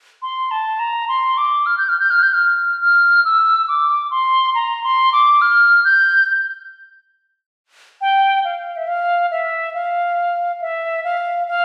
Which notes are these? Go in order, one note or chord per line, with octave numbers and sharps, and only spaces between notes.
C6
A5
A#5
C6
D6
F6
G6
F6
G6
F6
G6
F6
F6
E6
D6
C6
A#5
C6
D6
F6
G6
G5
F5
E5
F5
E5
F5
E5
F5
F5